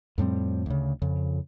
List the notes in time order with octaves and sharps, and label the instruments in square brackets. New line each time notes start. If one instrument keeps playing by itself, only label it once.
[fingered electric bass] F2 A2 G3 C4
D2 C#3
F2 C#3